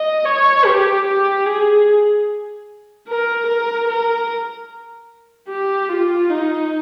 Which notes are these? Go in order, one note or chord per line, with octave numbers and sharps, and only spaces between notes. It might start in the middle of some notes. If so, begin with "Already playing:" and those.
Already playing: D#5
C#5
G4
G4
G#4
A#4
A#4
A#4
G4
F4
D#4